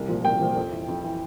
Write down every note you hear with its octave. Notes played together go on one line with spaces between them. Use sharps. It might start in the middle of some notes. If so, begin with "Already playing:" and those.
Already playing: C2
A#2 F3
C2 G5
A#2 F3
F2
E3
F2
E3